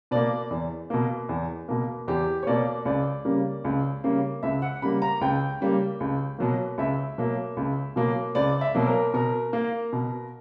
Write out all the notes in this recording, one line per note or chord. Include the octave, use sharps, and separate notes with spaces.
B2 A#3 D5
E2
B2 A#3
E2
B2 A#3
E2 G4
C#5
B2 A#3 D5
C#2 D5
C#3 G3 A#3
C#2
C#3 G3 A#3
C#2 E5
F#5
C#3 G3 A#3 B5
A#5
C#2 G5
C#3 G3 A#3
C#2
B2 F#3 A#3
C#2 E5
B2 F#3 A#3
C#2
B2 F#3 A#3
C#2 D5
E5
B2 F#3 A#3
A#4
B2 A#4
A#3
B2